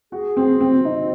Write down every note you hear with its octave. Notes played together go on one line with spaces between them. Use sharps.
F#4 G#4
C4
C4
C4 D#4